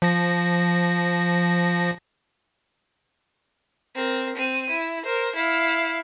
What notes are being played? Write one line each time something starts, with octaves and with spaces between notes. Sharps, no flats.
F3 A#6
C4 A#4
C4 D#7
E4
A#4 C5
E4 F5